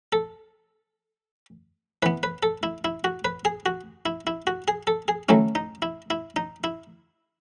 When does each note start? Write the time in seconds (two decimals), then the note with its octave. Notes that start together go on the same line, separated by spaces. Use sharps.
0.13 A4
2.03 E3 B3 B4
2.23 B4
2.43 A4
2.63 E4
2.85 E4
3.04 F#4
3.25 B4
3.45 G#4
3.66 F#4
4.06 E4
4.27 E4
4.47 F#4
4.68 G#4
4.87 A4
5.08 G#4
5.29 D#3 F#3 A3 C#4 E4
5.55 D#4
5.82 E4
6.10 E4
6.36 D#4
6.64 E4